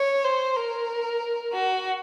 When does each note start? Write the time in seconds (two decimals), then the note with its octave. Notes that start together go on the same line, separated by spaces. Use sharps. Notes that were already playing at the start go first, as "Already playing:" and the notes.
Already playing: C#5
0.24 C5
0.56 A#4
1.53 F#4